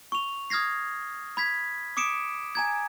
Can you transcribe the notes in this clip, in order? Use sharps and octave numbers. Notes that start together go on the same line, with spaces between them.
C#6 F7
D#6 F6 G#6 A#6 C7
B5 G#6 B6
D6 D#6 C#7 D7 E7
G#5 A#5 G#6